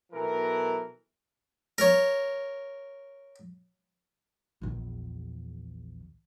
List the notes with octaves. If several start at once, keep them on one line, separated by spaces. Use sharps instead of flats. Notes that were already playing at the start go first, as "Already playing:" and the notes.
B1 B2 E3 A4 A#4
A#4 C#5
A#1 E2